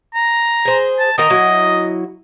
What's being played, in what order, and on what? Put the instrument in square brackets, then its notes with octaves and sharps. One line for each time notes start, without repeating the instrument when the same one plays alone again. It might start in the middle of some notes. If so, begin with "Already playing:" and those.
[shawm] A#5
[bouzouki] G#4 C5
[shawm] A5
[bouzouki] D#3 A#4 A#5 [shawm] D#5
[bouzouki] F#3 E4